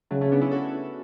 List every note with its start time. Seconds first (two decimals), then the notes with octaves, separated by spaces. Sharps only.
0.11 C#3 F#3 A3
0.21 A3 C#4
0.32 B3 D4
0.41 C#4 E4
0.51 F#4 A4